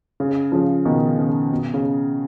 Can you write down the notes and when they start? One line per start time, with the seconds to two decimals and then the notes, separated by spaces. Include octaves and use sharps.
0.20 C#3
0.52 C#3 F3
0.85 B2 D#3
1.19 C#3
1.51 B2
1.74 C#3